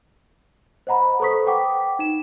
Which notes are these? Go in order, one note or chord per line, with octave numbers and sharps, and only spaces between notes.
C5 D#5 F#5 A#5 B5
A4 B4 C5 C#6 D#6 B6
F#5 G5 D6
D#4 E7